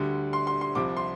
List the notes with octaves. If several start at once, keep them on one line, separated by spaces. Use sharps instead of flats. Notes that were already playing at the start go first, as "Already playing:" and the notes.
Already playing: D2 D3 G3
C6
C6
C6
C2 C3 F3 D6
C6